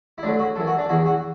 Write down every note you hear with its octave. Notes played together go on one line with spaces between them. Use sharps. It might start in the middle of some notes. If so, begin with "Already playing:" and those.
E4
D2 D3 F#3 D4
F#4
F#2 E3 A4
F#4
D4
E2 E3 F#4
F#4